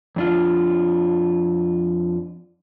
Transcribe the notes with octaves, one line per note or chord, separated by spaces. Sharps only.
F2 D4 F4